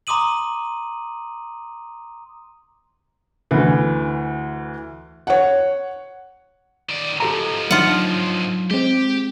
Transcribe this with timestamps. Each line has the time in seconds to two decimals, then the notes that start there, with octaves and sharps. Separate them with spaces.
0.07 A#5 C6 D6 D#6 D#7 F#7
3.51 D2 E3
5.27 C#5 F#5
6.89 D#3 D5
7.20 G#2 F3 G4 A4 A#5
7.71 F#3 D4 D#4 F4 F#5
8.71 G#3 C4 G4